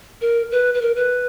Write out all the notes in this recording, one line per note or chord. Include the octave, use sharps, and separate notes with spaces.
A#4
B4
B4
A#4
B4